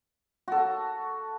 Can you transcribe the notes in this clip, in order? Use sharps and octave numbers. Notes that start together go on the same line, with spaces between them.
F#4 A4